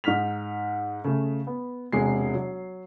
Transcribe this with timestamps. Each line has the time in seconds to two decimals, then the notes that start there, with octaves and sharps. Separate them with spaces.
0.04 G#2 D#4 F6 B6 F7
1.04 C#3 A3
1.47 B3
1.93 E1 C3 G#3 C7
2.35 F#3